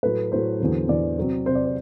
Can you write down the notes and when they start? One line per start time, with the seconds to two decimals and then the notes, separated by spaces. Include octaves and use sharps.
0.03 A2 F#3 A3 B4
0.32 A2 F#3 A3 C5
0.60 E2 D3 F#3
0.88 E2 D3 F#3 D5
1.18 C3 F#3 C4
1.46 C3 F#3 C4 C5
1.55 D5
1.65 C5